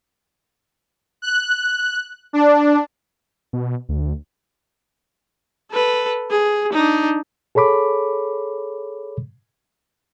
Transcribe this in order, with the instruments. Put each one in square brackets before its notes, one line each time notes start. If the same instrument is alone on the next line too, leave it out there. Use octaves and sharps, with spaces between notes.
[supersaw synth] F#6
D4
[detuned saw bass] B2
D2
[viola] A4 B4
G#4
D4 D#4
[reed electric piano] G#4 A4 C#5 B5 D6